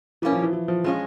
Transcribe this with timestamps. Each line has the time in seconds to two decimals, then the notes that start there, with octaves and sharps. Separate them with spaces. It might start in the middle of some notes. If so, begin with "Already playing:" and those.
0.22 E3 G3 A#3 C#4
0.32 F3
0.42 E3
0.53 E3
0.68 F3
0.84 F3 G#3 C#4 F4